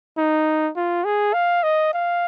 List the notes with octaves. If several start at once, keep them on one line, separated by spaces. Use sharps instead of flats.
D#4
F4
G#4
F5
D#5
F5